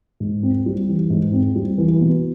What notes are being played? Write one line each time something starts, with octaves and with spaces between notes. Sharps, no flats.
G#2
C4
G3
E3
G#2
C4
G3
E3
B2